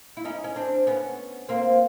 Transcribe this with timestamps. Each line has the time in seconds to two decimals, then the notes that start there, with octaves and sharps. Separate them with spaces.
0.17 E4
0.25 C#4 D#4
0.44 C#4
0.56 C4 D4
0.87 B3 C#4
1.49 A#3 C4